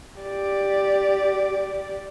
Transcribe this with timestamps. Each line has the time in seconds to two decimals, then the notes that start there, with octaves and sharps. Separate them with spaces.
0.21 G4 D5